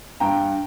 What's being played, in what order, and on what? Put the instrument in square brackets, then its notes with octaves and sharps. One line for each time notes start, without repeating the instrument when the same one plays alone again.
[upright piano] G2 G5 A#5